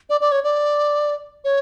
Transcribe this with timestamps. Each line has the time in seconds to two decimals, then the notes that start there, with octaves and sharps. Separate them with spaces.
0.10 D5
0.21 D5
0.32 C#5
0.44 D5
1.44 C#5